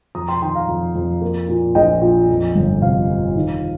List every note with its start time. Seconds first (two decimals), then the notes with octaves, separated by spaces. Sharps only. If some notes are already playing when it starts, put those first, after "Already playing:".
0.15 F2 A#5 D#6
0.28 G5 C6
0.42 D#3 G5 C6
0.55 F5 A#5
0.68 F2
0.95 F2
1.22 A#3
1.48 A#2
1.75 A#1 D#5 G5
2.02 A#2
2.29 F2
2.55 G1
2.82 C3 F5
3.09 F2
3.36 D#3